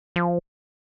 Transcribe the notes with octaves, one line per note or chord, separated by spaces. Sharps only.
F3